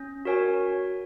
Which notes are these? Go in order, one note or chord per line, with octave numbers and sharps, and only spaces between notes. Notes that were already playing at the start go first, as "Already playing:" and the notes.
Already playing: C#4
F#4 A#4 C#5 G#5